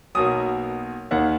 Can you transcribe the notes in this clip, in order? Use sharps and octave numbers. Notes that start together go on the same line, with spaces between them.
B1 B2 A#3 D#6
D#2 D#3 A#3 F#5